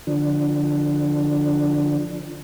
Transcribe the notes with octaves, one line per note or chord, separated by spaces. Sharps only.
D3 F3 D4